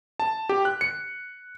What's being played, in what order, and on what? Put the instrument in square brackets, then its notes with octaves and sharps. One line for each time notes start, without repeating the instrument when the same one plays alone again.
[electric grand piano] A5
G4
F#6
C#7